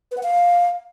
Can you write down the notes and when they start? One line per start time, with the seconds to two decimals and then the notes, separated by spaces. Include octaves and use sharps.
0.11 B4
0.17 F#5
0.23 F5